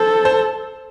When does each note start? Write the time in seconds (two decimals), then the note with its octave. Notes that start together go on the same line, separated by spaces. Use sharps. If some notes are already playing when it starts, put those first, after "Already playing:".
Already playing: A4 C5
0.25 C5